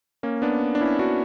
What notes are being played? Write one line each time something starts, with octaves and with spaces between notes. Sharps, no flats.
A#3 C#4
B3 D4
D4
C#4 E4
D4 F#4